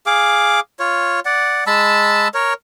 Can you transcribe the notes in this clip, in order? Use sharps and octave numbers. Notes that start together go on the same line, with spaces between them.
G#4 F5 D6
F4 C#5
D5 F#5
G#3 A5 B5 E6
A#4 C#5